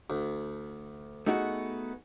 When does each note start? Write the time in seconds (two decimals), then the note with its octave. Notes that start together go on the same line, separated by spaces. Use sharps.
0.10 D2
1.26 A3 B3 D#4 F#4 G#4